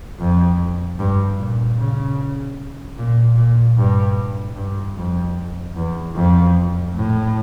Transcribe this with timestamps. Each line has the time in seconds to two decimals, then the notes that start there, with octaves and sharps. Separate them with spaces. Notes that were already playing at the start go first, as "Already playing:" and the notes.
0.20 F2
0.99 G2
1.39 A#2
1.78 C#3
2.98 A#2
3.37 A#2
3.77 G2
4.56 G2
4.96 F2
5.76 E2
6.15 F2
6.94 A2